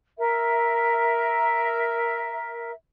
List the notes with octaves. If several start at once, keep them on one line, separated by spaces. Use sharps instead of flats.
A#4 E5